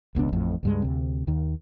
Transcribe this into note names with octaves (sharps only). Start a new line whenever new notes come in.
E1 C#2 B3 D4
A1 F2 A2
C#2 G2 G#3
D2 C3
D#2 D#3